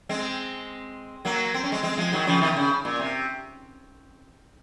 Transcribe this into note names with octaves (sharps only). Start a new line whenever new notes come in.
G#3 C4
F#3 A#3
C4
C#4
G#3 C4
G#3 C4
F3 G#3
D#3 F#3
C#3 F3
C3 D#3
C3
C#3
A#2
C3